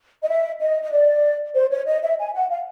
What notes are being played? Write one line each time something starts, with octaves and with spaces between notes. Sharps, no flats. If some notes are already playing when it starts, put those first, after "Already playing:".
D#5
E5
D#5
D#5
D5
C5
C#5
D#5
E5
G#5
F#5
F5